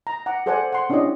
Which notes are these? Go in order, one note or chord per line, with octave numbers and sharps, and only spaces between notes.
A#5
F#5 A#5 D6
G#4 A4 C5 D5 F#5 G#5
F#5 C6
C#4 D4 E4 G4 D5 D#5